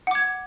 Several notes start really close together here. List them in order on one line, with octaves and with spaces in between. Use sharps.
F#5 D6 G#6